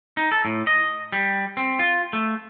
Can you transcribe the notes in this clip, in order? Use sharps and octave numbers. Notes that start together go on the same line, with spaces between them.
D#4
A4
A2
D#5
G3
C4
F4
A3